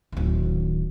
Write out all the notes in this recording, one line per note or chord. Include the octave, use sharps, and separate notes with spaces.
D1 D#3